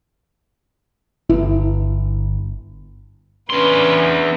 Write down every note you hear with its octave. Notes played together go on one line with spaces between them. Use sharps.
G1 E4
E2 C#4 D4 B4 C6